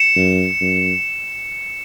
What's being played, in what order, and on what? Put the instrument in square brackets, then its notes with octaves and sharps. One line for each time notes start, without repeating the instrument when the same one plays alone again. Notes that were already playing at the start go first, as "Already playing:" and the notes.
Already playing: [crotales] C#7 E7
[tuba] F#2
F#2